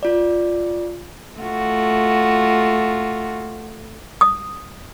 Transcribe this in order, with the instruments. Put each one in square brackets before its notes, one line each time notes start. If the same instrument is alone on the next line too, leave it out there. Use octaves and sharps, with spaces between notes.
[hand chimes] F4 D5
[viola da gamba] A3 F4 F#4
[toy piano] D#6